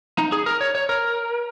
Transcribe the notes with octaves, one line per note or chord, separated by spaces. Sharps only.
D#4
G#4
A#4
C#5
C#5
A#4